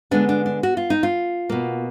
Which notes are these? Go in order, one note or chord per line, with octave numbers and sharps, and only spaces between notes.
D3 G#3 B3 D4
D4
D4
F#4
F4
D#4
F4
B2 A#3